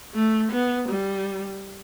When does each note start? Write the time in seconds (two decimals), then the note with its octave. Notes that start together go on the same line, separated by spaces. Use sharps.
0.14 A3
0.52 B3
0.89 G3